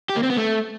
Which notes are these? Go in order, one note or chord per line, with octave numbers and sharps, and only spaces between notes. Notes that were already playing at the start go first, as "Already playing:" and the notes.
G4
A#3
C4
B3
A3